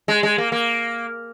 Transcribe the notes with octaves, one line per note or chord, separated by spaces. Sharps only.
G#3
G#3
A#3
A#3